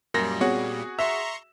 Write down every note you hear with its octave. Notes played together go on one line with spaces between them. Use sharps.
F#2 A#2 G3 A#4 A#6
B3 C4 F#4 G#4 C#5 F#5
E5 A#5 C6 C#6 E6